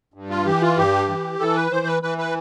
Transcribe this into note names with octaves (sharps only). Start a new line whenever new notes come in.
G2
F4
E3 G4
F4
G2 G4
E3
E3 A4
B4
E3 C5
B4
E3 B4
B4